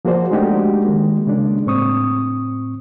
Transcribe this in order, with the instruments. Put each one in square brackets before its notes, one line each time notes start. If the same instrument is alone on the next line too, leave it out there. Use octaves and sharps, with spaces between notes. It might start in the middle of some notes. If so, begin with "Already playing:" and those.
[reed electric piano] F3 A#3 F#4 G#4 C5 D5
G#3 A3 D4 D#4 F#4 G4
D#3 G#3 A#3
C#3 G#3 A#3 D4
A2 C4 C#6 D#6